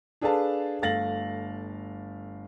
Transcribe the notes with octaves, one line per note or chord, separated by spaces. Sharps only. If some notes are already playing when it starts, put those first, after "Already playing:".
D4 G#4 A4 B4 F5 A5
G1 A3 F5 A6 A#6 F#7